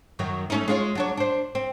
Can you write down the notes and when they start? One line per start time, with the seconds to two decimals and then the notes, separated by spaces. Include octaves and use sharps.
0.19 F#2 D#3 F#3
0.50 A3 C#4 D#4
0.68 G#3 F4 C#5
0.95 F#3 D4 C#5
1.17 D4 C5
1.55 C4